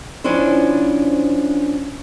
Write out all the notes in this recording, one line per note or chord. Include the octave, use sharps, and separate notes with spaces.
F3 C#4 D4 E4 C5